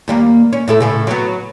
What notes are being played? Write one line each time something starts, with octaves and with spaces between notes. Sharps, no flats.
D#2 G3 A#3
C#4
A2 E4 A4
A2 C#3
F#3 B3